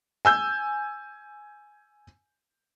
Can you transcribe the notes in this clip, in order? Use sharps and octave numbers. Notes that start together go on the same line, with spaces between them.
G#5 E6 G6